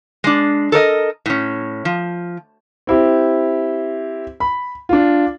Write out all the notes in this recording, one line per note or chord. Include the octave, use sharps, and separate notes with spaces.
G#3 D4
A4 A#4 D5 D#5
A2 C#4
F3
C4 E4 G4
B5
D4 F4